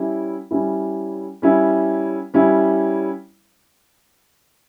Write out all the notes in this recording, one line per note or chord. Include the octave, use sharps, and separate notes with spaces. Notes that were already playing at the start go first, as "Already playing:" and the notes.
Already playing: G3 C#4 E4
G3 C#4 E4
G3 C#4 E4
G3 C#4 E4